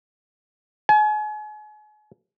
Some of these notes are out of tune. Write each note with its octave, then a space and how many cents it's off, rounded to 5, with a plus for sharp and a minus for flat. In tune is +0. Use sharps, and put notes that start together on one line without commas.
G#5 +35